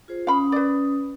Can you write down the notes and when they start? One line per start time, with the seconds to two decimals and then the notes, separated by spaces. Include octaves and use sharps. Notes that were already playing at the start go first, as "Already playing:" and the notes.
0.08 F4 G#4 C5
0.27 C#4 F5 B5 D#6
0.52 B4 D5